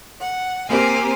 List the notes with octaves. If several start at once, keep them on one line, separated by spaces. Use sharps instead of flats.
F#5
A#3 C4 G4 C5 G#5